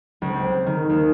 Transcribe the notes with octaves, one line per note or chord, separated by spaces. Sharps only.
C#2
C4
D#3
D#2